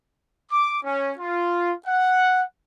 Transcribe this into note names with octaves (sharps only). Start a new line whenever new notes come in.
D6
C#4
F4
F#5